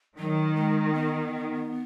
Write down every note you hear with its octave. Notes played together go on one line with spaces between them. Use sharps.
D#3 F#3
G#3
B3